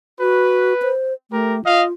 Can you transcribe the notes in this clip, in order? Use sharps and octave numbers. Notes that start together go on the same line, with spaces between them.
F#4 B4
C5
A3 G4 A#4
F4 D#5 F5